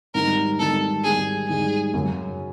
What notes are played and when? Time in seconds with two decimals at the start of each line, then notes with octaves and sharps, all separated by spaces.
0.15 G#2 D#3 G3 A#4
0.59 G#2 D#3 G3 A4
1.04 G#2 D#3 G3 G#4
1.48 G#2 D#3 G3 G#4
1.94 F#2 C#3 F#3